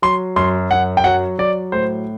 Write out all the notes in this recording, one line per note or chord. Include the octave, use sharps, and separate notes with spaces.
F#3 C6
F#2 C6
F#2 F#5
G5
F#3 F#5
F#3 D5
A2 C5